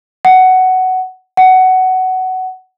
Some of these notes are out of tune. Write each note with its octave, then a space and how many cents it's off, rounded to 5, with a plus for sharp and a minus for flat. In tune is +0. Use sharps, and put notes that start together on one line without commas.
F#5 +10
F#5 +15